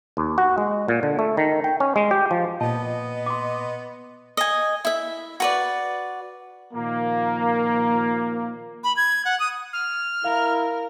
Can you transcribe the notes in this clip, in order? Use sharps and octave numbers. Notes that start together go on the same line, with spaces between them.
D#2
F#4
G#3
A#2
D3
A3
D#3
G5
C#4
G#3
G4
F3
A#2 B3 D#5 A5
C6 D6
D#5 G#5
E4 E5
F#4 B4 D5
A#2 D#3 F3 A#3
B5
G#6
F#5
D#6
F6
E4 A#4 F5